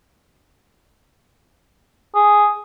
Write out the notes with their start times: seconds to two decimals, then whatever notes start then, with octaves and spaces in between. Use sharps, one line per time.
2.15 G#4